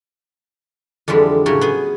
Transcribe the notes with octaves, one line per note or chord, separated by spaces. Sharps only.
F2 D3 E3 G3 G#3
A2 C#3 F#3
B3 G#4